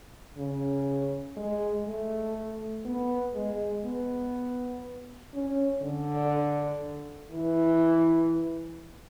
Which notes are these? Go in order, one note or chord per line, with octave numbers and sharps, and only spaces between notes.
C#3
G#3
A3
B3
G#3
B3
C#4
D3
E3